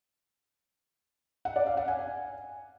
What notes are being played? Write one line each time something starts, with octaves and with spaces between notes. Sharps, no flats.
F#5
D5
F5
F#5
G#5